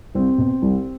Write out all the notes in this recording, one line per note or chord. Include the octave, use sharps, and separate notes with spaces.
C2 C4
B2
C2